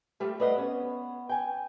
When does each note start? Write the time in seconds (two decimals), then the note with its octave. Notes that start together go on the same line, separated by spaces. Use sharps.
0.20 G3 A3 F4 G4
0.40 A3 B4 D5 D#5 F5 F#5
0.54 B3 C#4
1.29 G5 G#5